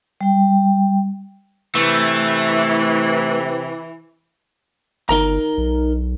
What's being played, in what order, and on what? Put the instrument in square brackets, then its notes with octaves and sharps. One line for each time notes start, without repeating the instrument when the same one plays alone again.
[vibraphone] G3 G5
[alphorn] C3 [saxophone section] E3 [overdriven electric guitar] A3
[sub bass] G1 [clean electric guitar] D#4 A#4 A#5
[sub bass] B1